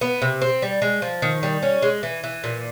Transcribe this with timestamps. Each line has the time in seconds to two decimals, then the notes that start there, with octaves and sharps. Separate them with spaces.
0.01 B3
0.22 C3
0.42 C4
0.62 G3
0.82 G#3
1.02 F3
1.22 D#3
1.43 G3
1.62 C#4
1.82 G#3
2.03 E3
2.24 E3
2.44 A#2